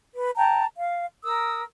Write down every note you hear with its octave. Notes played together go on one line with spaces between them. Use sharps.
B4
G5 A5 A#5
F5
A#4 D#6 E6